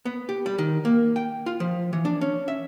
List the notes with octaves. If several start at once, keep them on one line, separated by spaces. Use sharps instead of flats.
B3
G4
G3
D#3
A#3
G5
F4
F3
E3
D4
C#4
E5